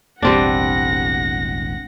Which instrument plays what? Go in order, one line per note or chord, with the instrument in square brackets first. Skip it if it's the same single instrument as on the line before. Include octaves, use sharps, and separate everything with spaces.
[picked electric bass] E1 A1 [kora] G3 C4 D4 [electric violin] F#5 A#6